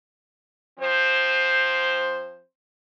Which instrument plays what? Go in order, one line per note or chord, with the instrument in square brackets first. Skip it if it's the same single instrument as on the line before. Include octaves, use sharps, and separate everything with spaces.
[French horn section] F3 C4 C5